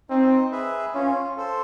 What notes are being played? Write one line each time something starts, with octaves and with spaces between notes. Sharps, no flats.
C4 D#4
G#4 B4 E5
C#4 F4
A4 C5